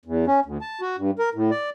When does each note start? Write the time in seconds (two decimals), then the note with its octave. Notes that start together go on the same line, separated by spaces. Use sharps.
0.06 E2
0.27 C#4
0.45 D2
0.61 A5
0.81 F#4
0.98 G2
1.19 A#4
1.35 A2
1.51 D5